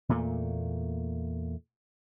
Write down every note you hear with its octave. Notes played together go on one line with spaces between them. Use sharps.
E2 A#2 A3 A#3